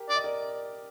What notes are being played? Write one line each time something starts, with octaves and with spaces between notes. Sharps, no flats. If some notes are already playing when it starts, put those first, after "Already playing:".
Already playing: G4 A#4
D5
D#5
A#4 D5